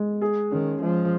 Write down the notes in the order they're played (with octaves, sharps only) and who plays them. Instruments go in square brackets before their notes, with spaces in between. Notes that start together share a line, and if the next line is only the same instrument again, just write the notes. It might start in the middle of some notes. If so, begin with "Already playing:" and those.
Already playing: [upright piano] G#3
G#4
[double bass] D#3 [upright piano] C#4
[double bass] F3 [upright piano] G#3